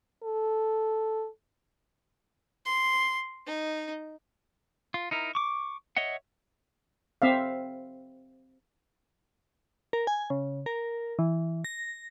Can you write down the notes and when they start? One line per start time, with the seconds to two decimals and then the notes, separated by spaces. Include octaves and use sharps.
0.23 A4
2.66 C6
3.47 D#4
4.94 F4
5.11 D#4 E4 A#4
5.35 C#6 D6
5.97 C#5 D#5 E5 F#5
7.22 C4 E5 F5
9.93 A#4
10.07 G#5
10.30 C#3
10.66 A#4
11.19 E3
11.65 A#6